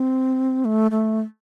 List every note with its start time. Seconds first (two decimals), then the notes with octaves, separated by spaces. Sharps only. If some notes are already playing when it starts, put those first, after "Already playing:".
Already playing: C4
0.65 A3
0.91 A3